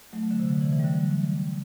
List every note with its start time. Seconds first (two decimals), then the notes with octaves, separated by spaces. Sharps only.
0.13 F#3 A3
0.31 D3
0.40 C3
0.49 D3
0.61 C3 E3
0.72 C3 E3
0.80 G3
0.84 D3 F#3